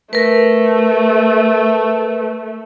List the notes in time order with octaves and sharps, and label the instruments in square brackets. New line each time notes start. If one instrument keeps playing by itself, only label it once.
[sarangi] A3 [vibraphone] A#4 B4